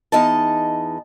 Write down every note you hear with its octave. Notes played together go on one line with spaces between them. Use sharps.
E2 D#4 D#5 A5